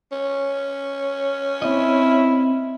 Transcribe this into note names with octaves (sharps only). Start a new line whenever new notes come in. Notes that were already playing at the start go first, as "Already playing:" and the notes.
C#4
C4 E4 D#5